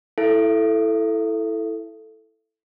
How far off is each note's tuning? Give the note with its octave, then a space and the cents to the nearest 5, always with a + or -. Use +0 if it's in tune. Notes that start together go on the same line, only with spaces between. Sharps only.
E4 +0 A4 +0 E5 +40